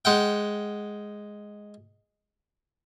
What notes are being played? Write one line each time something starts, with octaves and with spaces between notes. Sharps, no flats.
G#3 F#5 G5